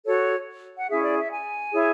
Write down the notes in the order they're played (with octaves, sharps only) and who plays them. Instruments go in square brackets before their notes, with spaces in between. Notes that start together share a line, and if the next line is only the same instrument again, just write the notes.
[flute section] F#4 A4 C#5
F#5
C#4 E4 G#4 E5
D5
E5
G#5
E4 G#4 C#5